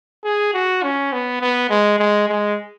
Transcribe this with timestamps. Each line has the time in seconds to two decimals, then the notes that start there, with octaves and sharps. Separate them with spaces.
0.24 G#4
0.54 F#4
0.83 C#4
1.13 B3
1.41 B3
1.70 G#3
1.99 G#3
2.29 G#3